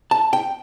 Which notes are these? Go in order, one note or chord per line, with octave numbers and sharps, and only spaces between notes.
A5
G5